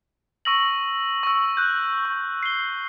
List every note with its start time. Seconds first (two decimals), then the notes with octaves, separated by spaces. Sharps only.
0.45 C#6 E6 A#6 F#7
1.23 C#6 E6
1.57 F#6 G6
2.05 C#6
2.43 C7 G7